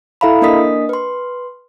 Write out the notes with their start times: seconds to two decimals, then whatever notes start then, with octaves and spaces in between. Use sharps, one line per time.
0.21 E4 A4 E5 F5 A#5 B5
0.42 A#3 D4 A#4 D#5 D#6 B6
0.89 B4 C6